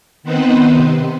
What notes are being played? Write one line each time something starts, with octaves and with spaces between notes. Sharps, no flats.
D#3 B3 C4 D#4 B4 C5
C3